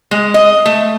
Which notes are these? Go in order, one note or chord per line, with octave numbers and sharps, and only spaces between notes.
G#3
D#5
A3